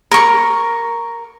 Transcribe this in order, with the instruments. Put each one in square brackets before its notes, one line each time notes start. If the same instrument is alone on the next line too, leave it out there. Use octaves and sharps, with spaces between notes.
[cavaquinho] A#4 C#6